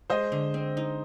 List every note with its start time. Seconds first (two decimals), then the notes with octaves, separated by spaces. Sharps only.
0.10 G#3 C5 D#5
0.32 D3
0.54 C4
0.77 D#4